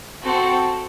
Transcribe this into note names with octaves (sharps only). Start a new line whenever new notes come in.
C4 F#4 A4